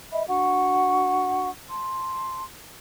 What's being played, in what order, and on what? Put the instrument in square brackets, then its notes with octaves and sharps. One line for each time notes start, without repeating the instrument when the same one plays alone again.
[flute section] D#5 E5 B5
D4 F#4 F#5 C#6
A5 C6